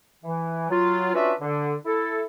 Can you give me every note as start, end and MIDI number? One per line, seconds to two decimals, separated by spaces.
0.24 0.68 52
0.69 1.13 54
0.69 1.13 65
1.14 1.33 61
1.14 1.33 62
1.14 1.33 65
1.14 1.33 66
1.14 1.33 71
1.14 1.33 76
1.41 1.74 50
1.85 2.23 64
1.85 2.23 69